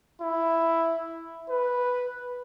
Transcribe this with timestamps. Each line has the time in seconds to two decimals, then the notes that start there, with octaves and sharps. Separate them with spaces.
0.22 E4
1.50 B4